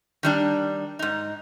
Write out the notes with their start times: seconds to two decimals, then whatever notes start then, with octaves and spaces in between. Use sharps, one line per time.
0.23 D#3 G3 D4
0.99 G#2 D#4